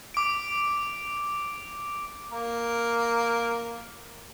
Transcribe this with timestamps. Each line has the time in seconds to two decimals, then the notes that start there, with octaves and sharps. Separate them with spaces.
0.14 D6 D7
2.31 A#3 A#4